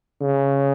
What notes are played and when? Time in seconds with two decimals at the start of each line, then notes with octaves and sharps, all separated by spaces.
0.22 C#3